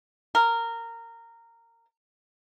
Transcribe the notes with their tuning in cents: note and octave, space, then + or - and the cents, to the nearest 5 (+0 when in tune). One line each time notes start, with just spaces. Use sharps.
A#4 -15